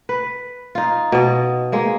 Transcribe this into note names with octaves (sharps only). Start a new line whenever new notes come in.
B4
D#4 F4
B2 D#5
G#3 A#3